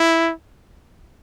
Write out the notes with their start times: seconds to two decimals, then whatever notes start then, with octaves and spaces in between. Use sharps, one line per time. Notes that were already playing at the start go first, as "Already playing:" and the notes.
Already playing: E4